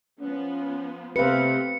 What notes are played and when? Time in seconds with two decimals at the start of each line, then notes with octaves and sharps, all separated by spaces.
0.20 F3 B3 C#4
1.16 C3 A3 B3 C4 B4 F5 C#7